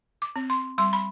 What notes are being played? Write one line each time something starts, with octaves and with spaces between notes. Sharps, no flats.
D6
C4
C6
G3 C6
B5